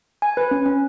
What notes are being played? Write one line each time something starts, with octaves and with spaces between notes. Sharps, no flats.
G#5
B4
C#4
C#4